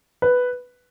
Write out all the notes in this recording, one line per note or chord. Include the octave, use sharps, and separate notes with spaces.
B4